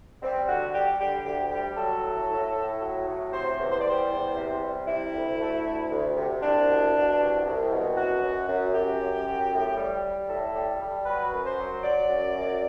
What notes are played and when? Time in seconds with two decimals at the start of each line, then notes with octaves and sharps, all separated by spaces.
0.22 G3 C4
0.49 D3 F#4
0.74 G3 G4
1.00 D3 G4
1.26 D2 G4
1.51 G3 G4
1.77 F#3 A4
2.03 A2
2.30 A2
2.55 A2
2.81 F#3
3.07 A2
3.32 C3 C5
3.58 E2
3.71 C5
3.81 G3 D5
3.90 C5
4.10 E2
4.35 C3
4.62 G3
4.87 C3 E4
5.13 D2
5.39 A3
5.65 D2
5.90 D2
6.17 C3
6.42 C2 D4
6.68 B2
6.94 B2
7.20 C2
7.45 C2
7.70 B2
7.97 F#2 F#4
8.23 F#2
8.48 F#2
8.74 F#2 G4
9.00 F#2
9.26 F#2
9.51 A2
9.77 G3
10.03 G3
10.29 A2 A4
10.55 G3
10.80 G3
11.06 F#3 B4
11.32 F#2
11.45 C5
11.58 F#3
11.84 F#3 D5
12.09 F#2
12.36 F#2